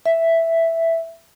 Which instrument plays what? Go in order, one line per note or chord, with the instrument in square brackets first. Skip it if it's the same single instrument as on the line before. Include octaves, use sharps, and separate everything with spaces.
[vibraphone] E5